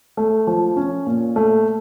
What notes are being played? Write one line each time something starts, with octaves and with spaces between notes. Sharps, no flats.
A3
F3
C#4
A#2
A3